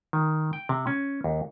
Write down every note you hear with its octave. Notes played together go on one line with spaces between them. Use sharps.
D#3
G5
C3
C#4
D#2